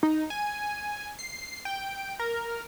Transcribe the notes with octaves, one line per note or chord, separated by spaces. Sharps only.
D#4
G#5
C7
G5
A#4